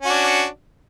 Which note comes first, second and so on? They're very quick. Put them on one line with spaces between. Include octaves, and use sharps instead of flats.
C#4 F#4 D4